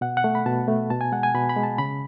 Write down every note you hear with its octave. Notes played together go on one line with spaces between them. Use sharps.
B2 F#5
F#5
A3
B5
B2 A5
A3
B2 A5
G#5
G#3 F#5
G#5
B2 B5
B5
G#3
A5
C#3 B5